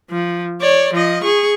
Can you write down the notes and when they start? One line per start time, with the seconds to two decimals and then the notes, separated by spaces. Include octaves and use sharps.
0.10 F3
0.61 C#5 D5
0.94 F3 D#5
1.24 G#4 C#6